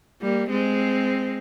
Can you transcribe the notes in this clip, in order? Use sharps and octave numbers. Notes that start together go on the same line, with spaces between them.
G3 A#3
G#3 C4